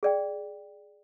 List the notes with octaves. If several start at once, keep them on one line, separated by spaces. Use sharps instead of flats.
G#4 D5 G5